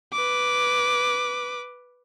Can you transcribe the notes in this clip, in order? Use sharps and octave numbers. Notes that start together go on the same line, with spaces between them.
B4 D6